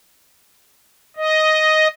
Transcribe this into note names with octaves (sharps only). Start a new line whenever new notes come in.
D#5